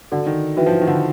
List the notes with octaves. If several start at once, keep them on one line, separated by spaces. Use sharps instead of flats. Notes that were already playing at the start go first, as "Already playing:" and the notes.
D3 F#4 A4 D5
D#3
E3 D4 F#4 B4 E5 G5
F3
E3
D#3
D3